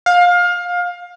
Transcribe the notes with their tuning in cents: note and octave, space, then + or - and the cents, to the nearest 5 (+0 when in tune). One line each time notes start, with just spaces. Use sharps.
F5 +25